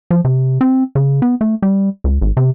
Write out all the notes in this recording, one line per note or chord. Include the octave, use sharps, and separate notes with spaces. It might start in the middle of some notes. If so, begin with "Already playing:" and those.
F3
C3
C4
C#3
B3
A3
G3
C#2
G#1
C3